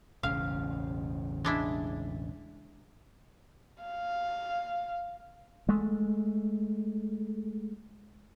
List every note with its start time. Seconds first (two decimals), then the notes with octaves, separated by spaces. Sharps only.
0.23 E1 A1 C#3 F5
1.45 G#3 D4 E4
3.83 F5
5.69 G#3 A3